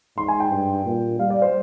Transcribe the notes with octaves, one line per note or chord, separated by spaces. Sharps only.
G#2 C6
G#5
G5
G2
A#2
G3 F5
D5
C5